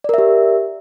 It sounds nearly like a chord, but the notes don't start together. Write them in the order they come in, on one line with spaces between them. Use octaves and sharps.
D5 A#4 E5 G4